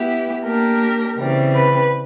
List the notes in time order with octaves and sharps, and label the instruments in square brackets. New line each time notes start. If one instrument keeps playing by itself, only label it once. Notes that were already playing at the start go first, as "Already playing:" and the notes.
Already playing: [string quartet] B3 E4 G4
[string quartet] A#3 D4 G4 [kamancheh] A#4
[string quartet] C#3 E3 G3 C4
[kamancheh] B4